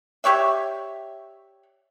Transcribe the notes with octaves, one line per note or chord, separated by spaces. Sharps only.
G4 C#5 D5 E5